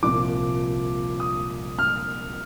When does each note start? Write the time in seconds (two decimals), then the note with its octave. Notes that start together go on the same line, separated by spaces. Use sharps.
0.03 C2 A#2 F3 D6
1.20 D#6
1.79 F6